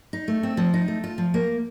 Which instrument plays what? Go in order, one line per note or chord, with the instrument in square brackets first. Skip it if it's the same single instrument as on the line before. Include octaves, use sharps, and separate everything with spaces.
[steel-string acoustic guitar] D#4
A3
C4
F3
D#4
A3
F4
F3
A#3